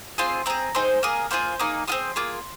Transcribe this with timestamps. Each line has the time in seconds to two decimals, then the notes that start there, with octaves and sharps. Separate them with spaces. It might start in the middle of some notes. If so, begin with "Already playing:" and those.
0.18 C4 F4 G#4 C6
0.46 C4 G#4 A#5
0.75 C4 D#4 G#4 C5
1.03 A#3 G#4 A#4
1.31 A#3 F4 G#4 C5
1.60 A#3 D#4 G#4
1.88 C4 F4 G#4 C6
2.16 A#3 F4 G#4